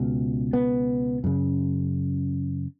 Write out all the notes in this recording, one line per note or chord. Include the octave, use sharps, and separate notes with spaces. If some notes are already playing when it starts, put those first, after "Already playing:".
Already playing: C#2 B2
B3
F#2 C#3